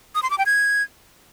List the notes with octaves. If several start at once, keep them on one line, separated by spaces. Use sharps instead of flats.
D#6
C6
D6
G5
G#6